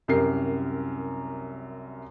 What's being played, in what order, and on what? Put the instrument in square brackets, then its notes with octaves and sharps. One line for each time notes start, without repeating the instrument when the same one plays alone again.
[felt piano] C2 F#2 G4 A#4 C7